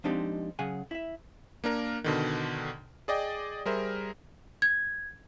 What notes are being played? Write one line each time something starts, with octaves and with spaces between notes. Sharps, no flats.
F3 G#3 C4 D4 D#4 G4
C#3 F#3 G#4 F#5 G#5
E4 E5
A#3 D4 A#4
B2 D3 D#3
G#4 D5 D#5 G5
G3 G#4 A#4 C5 E5
G#6